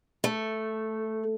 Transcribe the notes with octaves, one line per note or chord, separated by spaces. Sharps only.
A3